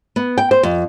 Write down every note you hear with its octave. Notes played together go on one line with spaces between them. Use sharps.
B3
G5
C5
F2